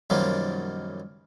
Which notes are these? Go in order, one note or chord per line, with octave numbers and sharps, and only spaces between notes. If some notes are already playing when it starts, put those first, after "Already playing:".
B1 F#2 D#3 F3 G3 A#3